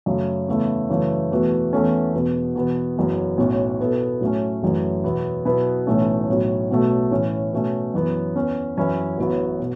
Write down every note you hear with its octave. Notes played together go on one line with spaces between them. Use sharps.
F#2 C#3 F#3 A3
E2 C#3 A3 E4
F#2 C#3 E3 A3
E1 E2 E3 A3 F#4
E2 E3 A3 C#4 A4
E1 E2 B2
E2 B2 B3
F#1 F#2 E3 B3 F#4
B1 A2 F#3 C#4 F#4
B2 B3 E4 A4
A2 F#3 A3 C#4
F#1 F#2 E3 A3
E2 B2 B3 E4
B2 F#3 B3 E4 B4
B1 A2 E3 A3 C#4
B1 A2 F#3
B1 B2 F#3 A3
A2 E3 C#4
B2 A3 C#4
F#2 E3 B3
E2 E3 C#4
F#2 E3 C#4 E4 B4
A1 A2 F#3 B3 E4
B2